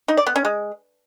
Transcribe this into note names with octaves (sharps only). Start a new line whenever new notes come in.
D#4
D5
B3
C#4
G#3